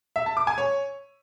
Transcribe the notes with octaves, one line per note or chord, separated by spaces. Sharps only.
E5
A5
D6
G#5
C#5